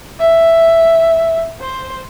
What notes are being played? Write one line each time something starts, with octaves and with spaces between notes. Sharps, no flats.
E5
C5